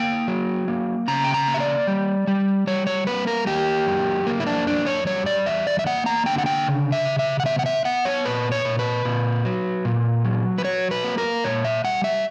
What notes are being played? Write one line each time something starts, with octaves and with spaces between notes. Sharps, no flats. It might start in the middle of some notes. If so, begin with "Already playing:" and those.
Already playing: A#3 G5
F#3
A#3
C#3 A#5
G5
A#5
A#3
E5
D5
G3
G3
G3 C#5
C#5
A#3 B4
A#4
A#3 G4
F#2
A#3
E4
D4
F#2 D4
C#5
G3 C#5
D5
E2 E5
D5
E5
A#3 F#5
A#5
D3 G5
F#5
G5
C#3
E5
C#3
E5
F#5
B3 E5
F#5
E5
B3 F#5
C#5
A#2 B4
C#5
A#2
B4
A#2
F#3
A#2
F#3
B4
F#3 C#5
B4
A#3
A#4
A#2 C#5
E5
G3 F#5
E5